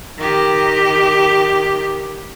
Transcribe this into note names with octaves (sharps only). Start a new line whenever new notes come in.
D#3 G4